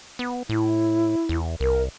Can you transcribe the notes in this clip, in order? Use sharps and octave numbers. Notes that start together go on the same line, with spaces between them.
B3
A2 E4
E2
C2 A#4